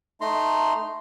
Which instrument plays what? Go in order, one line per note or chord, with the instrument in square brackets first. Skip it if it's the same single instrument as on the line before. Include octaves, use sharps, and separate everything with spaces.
[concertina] A3 D#4 A#5 C6